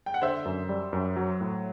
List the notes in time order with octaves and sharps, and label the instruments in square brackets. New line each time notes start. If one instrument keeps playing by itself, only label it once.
[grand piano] G5
F#5
[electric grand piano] D3 [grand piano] C5 E5
[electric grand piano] F#2
G3
F#2
F#3
A2